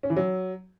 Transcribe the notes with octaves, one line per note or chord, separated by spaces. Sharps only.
C#4
E3
F#3